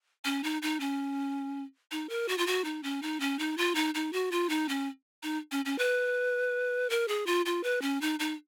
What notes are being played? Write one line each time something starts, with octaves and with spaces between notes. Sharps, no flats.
C#4
D#4
D#4
C#4
D#4
A#4
F#4
F4
F#4
D#4
C#4
D#4
C#4
D#4
F4
D#4
D#4
F#4
F4
D#4
C#4
D#4
C#4
C#4
B4
A#4
G#4
F4
F4
B4
C#4
D#4
D#4